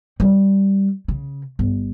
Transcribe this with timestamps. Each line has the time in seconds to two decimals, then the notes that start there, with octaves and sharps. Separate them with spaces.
0.20 G3
1.08 C#3
1.59 G1